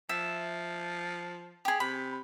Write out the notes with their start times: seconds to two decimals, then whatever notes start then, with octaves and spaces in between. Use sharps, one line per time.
0.09 F3 E5
1.65 G4 G#4
1.80 C3 B5